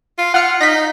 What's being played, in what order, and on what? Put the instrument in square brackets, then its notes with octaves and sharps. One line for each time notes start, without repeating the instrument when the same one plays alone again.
[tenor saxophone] F4
[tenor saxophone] F4 [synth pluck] F#5 F6 C#7
[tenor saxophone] D#4 [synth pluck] A#6 B6